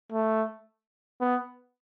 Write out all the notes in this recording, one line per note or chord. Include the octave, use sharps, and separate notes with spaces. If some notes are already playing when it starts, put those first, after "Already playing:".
A3
B3